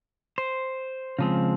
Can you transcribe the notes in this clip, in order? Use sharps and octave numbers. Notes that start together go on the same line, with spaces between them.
C5
C#3 F3 G#3 C4